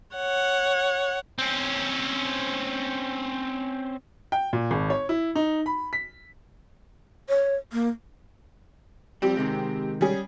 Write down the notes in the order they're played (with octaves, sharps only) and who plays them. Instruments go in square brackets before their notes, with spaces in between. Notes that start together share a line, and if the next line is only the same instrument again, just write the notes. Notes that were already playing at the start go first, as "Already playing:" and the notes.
[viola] C#5 F#5
[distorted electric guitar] C4 C#4
[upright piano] G5
A#2
G#1
C#5
E4
D#4
B5
B6
[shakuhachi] C#5
A#3
[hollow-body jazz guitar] F3 G3 [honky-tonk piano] C4 G4
[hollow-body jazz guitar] C3 D#3 G#3
[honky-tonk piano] G3 C#4 G#4